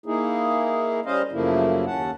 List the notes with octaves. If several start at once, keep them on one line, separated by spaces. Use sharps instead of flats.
A#3 D#4 E4 G#4
G3 C#4 C5 D#5 F5
F#2 C#3 F3 A3 A#3 E4
D#2 C#4 F#5 A5